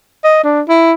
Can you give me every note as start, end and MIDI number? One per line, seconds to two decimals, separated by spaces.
0.24 0.39 75
0.44 0.61 62
0.69 0.93 64